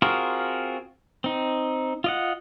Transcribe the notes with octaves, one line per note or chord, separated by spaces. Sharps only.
C4 F4 F#4 G#4 A#4
C4 D#4
F4 D#5 F#5